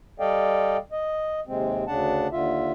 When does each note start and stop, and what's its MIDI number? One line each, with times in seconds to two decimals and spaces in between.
0.20 0.77 55
0.20 0.77 69
0.20 0.77 74
0.20 0.77 75
0.20 0.77 77
0.20 0.77 79
0.92 1.40 75
1.47 1.84 39
1.47 1.84 48
1.47 1.84 56
1.47 1.84 60
1.87 2.28 38
1.87 2.28 49
1.87 2.28 62
1.87 2.28 78
1.87 2.28 81
2.32 2.72 39
2.32 2.72 50
2.32 2.72 65
2.32 2.72 76